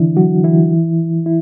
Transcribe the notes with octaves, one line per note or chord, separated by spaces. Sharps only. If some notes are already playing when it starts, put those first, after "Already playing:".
Already playing: D3 E3 D4 E4
F#3 F#4
E3 E4
E4